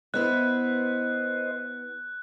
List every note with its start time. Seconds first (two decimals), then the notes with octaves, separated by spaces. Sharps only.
0.14 B3 E4 B4 C5 D#5 F#6